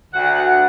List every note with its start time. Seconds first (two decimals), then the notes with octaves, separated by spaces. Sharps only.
0.14 D2 F#5
0.36 F#5